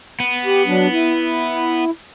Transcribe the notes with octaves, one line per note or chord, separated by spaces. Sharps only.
B3
G4
F#3 D4
E4